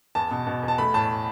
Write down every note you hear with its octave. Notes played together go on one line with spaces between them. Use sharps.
E2 A5
B2
B2
E2
A5
A3 B5
A2 A5